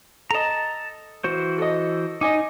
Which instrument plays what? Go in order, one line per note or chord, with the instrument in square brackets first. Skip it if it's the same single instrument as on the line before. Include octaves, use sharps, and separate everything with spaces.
[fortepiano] A4 D#5 [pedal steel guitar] A5 A#5
[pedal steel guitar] E3 F#4 C5
[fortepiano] A4 D#5
[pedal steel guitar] D#4 [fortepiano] D#5 G#5 D6